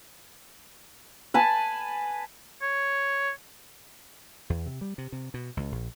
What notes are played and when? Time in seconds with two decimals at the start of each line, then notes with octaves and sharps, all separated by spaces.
1.34 B4 G#5 A5
2.62 C#5
4.50 E2
4.66 C3
4.81 G3
4.98 C3
5.12 C3
5.34 B2
5.57 C#2
5.72 A#1